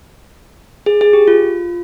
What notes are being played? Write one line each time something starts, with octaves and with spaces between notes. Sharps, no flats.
G#4
G#4
G4
F4